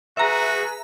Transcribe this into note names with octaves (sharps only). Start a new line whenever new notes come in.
F#4 G#4 B4 E5 A#5